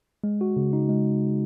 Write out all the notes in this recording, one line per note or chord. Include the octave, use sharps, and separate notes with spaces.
G#3
F#4
C#3
D#4
G#3